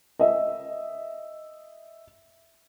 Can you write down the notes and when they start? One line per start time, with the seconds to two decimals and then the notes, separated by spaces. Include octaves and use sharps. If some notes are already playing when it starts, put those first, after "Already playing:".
0.19 D#5 E5